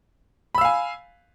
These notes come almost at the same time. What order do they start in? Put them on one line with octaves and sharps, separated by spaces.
B5 E6 F5 G#5